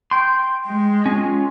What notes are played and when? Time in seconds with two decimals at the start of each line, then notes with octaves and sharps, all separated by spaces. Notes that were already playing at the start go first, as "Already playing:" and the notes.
0.11 G5 C6
0.67 G#3
1.06 C#4 F4